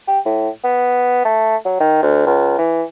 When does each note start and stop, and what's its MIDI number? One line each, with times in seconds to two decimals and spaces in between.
0.08 0.19 67
0.26 0.49 45
0.64 1.23 59
1.25 1.56 57
1.65 1.80 54
1.80 1.99 51
2.03 2.27 38
2.27 2.54 37
2.58 2.83 52